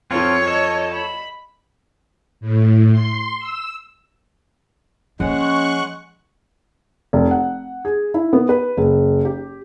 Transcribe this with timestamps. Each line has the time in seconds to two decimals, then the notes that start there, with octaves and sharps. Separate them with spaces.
0.11 F2 F3 C4 F4 A4 C#5
0.48 A4 D#5
0.95 B5
2.41 A2
2.92 C6
3.38 E6
5.20 F3 G#3 A#3 C#4 F#5 C#6 F#6
7.13 F1
7.31 F#5
7.85 G#4
8.14 E4
8.33 B3
8.49 B4
8.77 F#1
9.25 G4